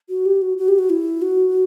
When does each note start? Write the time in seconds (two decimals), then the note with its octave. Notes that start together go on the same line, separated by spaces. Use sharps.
0.09 F#4
0.26 G4
0.42 F#4
0.58 F#4
0.68 G4
0.79 F#4
0.90 E4
1.22 F#4